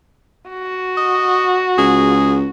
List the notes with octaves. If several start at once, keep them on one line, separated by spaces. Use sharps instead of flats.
F#4
D#5
C#2 G#4